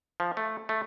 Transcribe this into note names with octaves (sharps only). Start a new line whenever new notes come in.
F3
A3
A3